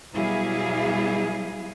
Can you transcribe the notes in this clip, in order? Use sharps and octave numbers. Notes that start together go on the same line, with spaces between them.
B2 F#3 G3 E4 G#4 F5